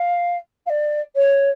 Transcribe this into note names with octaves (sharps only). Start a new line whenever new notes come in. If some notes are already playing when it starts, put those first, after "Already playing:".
Already playing: F5
F5
D5
C#5